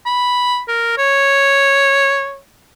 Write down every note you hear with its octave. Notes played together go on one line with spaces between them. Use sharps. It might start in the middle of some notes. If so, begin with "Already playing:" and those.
B5
A#4
C#5